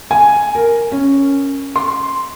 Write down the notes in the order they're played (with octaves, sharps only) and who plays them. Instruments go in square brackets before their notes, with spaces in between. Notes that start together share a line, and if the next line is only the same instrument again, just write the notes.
[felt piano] G#5
A#4
C#4
C6